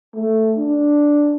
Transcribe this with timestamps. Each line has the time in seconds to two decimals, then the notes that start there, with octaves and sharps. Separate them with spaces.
0.15 A3
0.56 D4